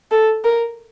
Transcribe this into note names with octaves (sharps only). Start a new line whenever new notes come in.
A4
A#4